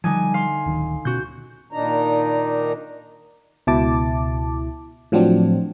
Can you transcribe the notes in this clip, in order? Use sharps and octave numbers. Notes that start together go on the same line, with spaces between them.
D3 F3 G3 D#4 G#5
F5 C6
D1 D#3
B2 C#4 F#4 G6
A#2 D#3 D4 D#4 A#5
C#2 B2 E4 A5 D6
A2 F3 F#3 C4 D4